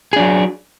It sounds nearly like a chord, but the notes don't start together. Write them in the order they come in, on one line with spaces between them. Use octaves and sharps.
G#4 D4 F#3